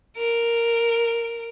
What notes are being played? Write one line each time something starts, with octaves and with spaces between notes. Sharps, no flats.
A#4 D7